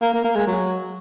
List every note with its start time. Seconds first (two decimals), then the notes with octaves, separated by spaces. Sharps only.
0.02 A#3
0.13 A#3
0.25 A#3
0.36 G#3
0.47 F#3